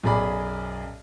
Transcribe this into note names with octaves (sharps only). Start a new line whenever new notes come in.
B1 F#2 G#4 D5 B5